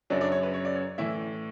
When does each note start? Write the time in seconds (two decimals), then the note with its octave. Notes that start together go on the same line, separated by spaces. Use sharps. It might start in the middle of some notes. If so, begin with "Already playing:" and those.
0.10 F#2 C#3 F#3 D4 D5
0.21 D4 D5
0.32 C#5
0.43 B4
0.54 C#5
0.65 D5
0.75 C#5
0.98 A2 E3 E4 E5